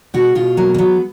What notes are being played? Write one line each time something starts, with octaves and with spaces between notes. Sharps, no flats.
B2 F#4
B2 F4
F#3 A#3
A#3
F#3 B3